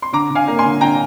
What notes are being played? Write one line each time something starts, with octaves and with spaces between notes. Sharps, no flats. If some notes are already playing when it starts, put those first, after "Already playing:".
C6
D3 A#5 D6
D3
F5 G#5
A#3
G#5 C6
D3
D3 G5 A#5